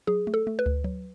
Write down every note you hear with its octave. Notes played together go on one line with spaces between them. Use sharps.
F#3 G#4
A3
A4
A3
B4
D2
F#3